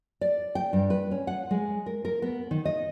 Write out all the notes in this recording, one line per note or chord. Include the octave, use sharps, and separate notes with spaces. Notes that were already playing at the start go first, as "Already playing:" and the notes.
D5
G5
G2
B4
C#4
F#5
G#3
A#4
A#4
B3
D#3
D#5